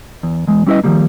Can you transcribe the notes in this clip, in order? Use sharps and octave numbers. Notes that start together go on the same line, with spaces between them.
E2
E2 G#3
G3 C#4 E4 G#4 B4 D#5
D#3 F3 G3 A#3